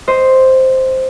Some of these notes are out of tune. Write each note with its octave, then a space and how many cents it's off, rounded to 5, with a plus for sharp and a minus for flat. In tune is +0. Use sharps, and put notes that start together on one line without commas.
C5 +0 D#5 +0